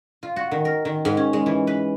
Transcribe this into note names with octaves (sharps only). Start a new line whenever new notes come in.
F4
F#4
D#3
A#4
D#3
G#2
C#4
G#3
E3
B4